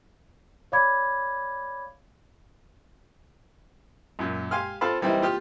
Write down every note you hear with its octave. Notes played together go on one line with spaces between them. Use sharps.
C#5 D5 F5 B5 D6 G#6
F#2 A#2
G4 F5 G#5 C6 F6
C4 F4 A4 F5 A5 B5
E3 G3 A#3 C4 D#4 E4
F4 G4 F6